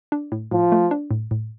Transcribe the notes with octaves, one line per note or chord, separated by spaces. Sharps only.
D4
A2
A2 F3
A3
D4
A2
A2